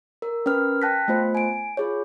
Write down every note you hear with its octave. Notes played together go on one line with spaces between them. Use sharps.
A#4
C#4 A#4 B4 F6
G5 A5 F#6 A#6 B6
A3 B3 F4 C5
G#5 D7
F4 G#4 C#5